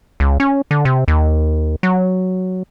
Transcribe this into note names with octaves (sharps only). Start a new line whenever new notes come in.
C#2
C#4
D3
C3
D#2
F#3